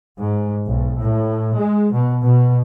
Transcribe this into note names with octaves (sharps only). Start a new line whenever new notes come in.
G#2
B1
A2
G#3
B2
B2